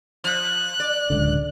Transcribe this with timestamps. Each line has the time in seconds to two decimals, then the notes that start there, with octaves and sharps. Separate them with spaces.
0.24 F3 F#6
0.80 D5
1.10 D1 C#2 D3